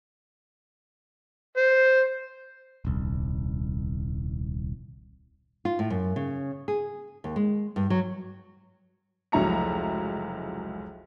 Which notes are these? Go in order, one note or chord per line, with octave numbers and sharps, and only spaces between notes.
C5
D#1 C2
F4
A2
F#2
C#3
G#4
D#2
G#3
G2
F#3
F1 C#2 F#3 E4 A#5 C#7